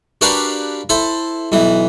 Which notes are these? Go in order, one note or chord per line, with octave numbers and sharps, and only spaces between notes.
D4 F#4 G4 A#4 B4 F5
E4 A4 C5
B1 E3